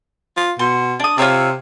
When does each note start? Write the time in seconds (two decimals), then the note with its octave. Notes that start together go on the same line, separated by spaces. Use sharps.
0.37 F4
0.59 B2 C6
1.00 D4 D#6
1.18 C3 F4 C#5 E6